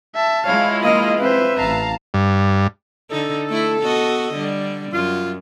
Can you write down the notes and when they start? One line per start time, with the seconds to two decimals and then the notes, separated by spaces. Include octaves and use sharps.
0.15 E5 A5
0.46 G#3 E4 F4 C#5 F5
0.83 A#3 D#5 F5
1.19 C4 B4 C5 E5
1.58 A1 F5 A5 A#5
2.14 G2
3.11 D3 D#4 A4
3.49 A3 E4
3.81 B3 F#4 D#5
4.34 D3 G3
4.92 F#2 F4